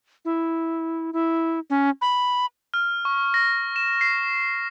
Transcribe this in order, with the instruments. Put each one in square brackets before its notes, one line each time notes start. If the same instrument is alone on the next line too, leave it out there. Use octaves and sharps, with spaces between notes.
[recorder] E4
E4
C#4
B5
[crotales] F6
C#6
A#6
E7
C7